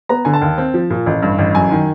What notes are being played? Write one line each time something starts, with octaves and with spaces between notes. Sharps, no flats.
B3 A#5
D3 G#5
A5
D#2
C4
F3
A#2
A1
G2
A1
F#2 G#5
D#3